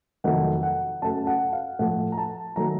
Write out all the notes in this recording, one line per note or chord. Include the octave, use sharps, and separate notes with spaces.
F2 C3 D#3 F#3 A3 F#5
F#5
F#2 C#3 A3 A5
F#5
F5
A2 F3 A3 F#5
A#5
A5
D#3 F#3 A3 A#5